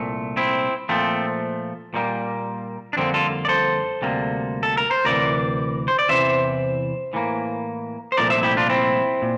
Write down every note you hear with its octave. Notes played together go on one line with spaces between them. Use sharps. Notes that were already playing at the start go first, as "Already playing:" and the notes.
Already playing: C2 A#2 A3
C4 E4
A#2 F3 A3 C4
A#2 G3 A#3
D4
F2 D3 G3 A#3 C4
F4 A4
D5
A4 C5
D2 C3 G3 A#3
A4
A#4
C5
D2 C3 E3 A#4 D5
C5
D5
E2 C3 E3 C5 E5
A2 E3 G3 A#3
C5
C2 A#2 F3 A3 A#4 D5
C5 E5
E4 G4
D4 F4
C4 E4
A#2